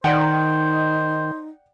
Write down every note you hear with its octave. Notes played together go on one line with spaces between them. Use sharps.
D#3 D#4 C5 D5 F#5 G5